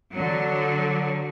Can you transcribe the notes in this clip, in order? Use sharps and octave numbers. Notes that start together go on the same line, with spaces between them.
D3 F#3